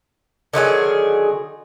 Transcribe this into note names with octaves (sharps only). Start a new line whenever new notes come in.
D3 D#3 F#3 G#4